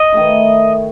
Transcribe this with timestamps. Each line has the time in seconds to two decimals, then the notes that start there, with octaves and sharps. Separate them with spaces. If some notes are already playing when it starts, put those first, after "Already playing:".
Already playing: D#5
0.12 D#3 A3 E4